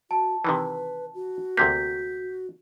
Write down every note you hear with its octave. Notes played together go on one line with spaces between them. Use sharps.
F#4 A5
C3 D#3 E3 B4
F#4
D2 C3 A#3 G6 B6